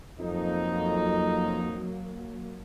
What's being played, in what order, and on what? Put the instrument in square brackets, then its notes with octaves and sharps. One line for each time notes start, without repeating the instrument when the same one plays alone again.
[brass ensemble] F2 D#4 [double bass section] F#3 A#3